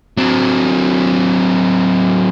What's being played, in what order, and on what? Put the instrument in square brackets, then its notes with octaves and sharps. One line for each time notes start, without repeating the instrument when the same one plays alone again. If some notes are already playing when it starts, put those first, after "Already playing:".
[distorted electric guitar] F#3 C4